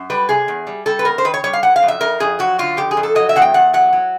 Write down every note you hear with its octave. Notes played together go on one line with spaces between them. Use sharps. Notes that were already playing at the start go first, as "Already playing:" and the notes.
Already playing: F#2
G3 B4
C3 G#4
E2
G3
G3 A4
B4
E2 A#4
C5
D#3 B4
C#5
G3 C#5
F5
F#3 F#5
F5
F2
E5
F2 A#4
F2 G#4
F#3 F#4
D3 F4
F2 G4
G#4
F2
A4
F#3 D#5
E5
E2 F#5
G5
E2 F#5
F#3 F#5
F#3